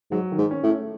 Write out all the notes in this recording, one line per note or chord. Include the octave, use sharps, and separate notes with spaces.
G#2 F#3
D#3
G#2
C#4
A2
A3